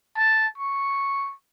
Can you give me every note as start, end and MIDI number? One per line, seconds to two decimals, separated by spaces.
0.17 0.47 81
0.58 1.33 85